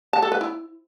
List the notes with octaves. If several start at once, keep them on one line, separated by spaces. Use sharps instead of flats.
A5
A4
B4
E4